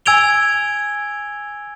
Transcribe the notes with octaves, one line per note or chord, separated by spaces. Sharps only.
G#5 E6 G#6 D7 F7 G7